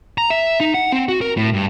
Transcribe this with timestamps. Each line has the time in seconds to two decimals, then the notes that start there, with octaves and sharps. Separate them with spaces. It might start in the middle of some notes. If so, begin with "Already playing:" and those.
0.18 A#5
0.30 E5
0.60 D#4
0.74 F#5
0.92 C4
1.09 F#4
1.21 A#4
1.37 A2
1.53 G2